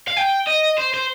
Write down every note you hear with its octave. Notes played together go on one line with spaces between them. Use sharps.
F5
G5
D#5
C5
C5